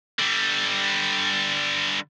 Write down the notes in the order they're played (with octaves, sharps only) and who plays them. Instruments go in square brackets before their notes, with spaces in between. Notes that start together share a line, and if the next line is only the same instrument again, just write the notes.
[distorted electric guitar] D3 G3